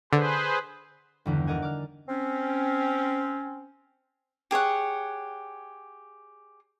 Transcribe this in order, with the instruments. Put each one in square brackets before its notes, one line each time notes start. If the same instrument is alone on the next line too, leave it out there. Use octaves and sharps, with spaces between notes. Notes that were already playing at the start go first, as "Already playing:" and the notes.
[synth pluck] D3 [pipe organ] G#4 B4 C5
[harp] G1 E2 D3 D#3
A#4 D5 D#5 F#5 G#5
D5 D6 F6
[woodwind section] C4 C#4
[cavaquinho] G4 G#4 C#5 F#5